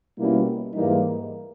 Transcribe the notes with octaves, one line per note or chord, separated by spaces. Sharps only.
B2 G3 A#3 C#4 E4
G#2 E3 G3 A#3 D#4